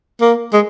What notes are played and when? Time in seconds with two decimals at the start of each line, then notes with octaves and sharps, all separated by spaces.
0.21 A#3
0.53 G#3